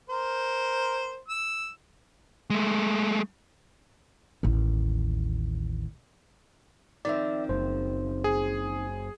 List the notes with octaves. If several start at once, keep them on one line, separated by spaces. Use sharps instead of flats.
A#4 C5
E6
G#3 A3
A1 D#2
D#3 F3 C4 D5 E5
F#1 C5
G#4